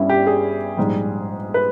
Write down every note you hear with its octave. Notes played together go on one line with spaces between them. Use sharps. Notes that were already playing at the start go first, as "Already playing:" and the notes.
Already playing: G1 G2 G3 C#4 E4
G4
G#4
A#1 G#2 G3
B4